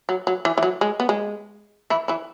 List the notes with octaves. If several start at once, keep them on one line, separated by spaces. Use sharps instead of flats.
F#3
F#3
E3
E3
F#3
G#3
B3
G#3
E3 E4
E3 E4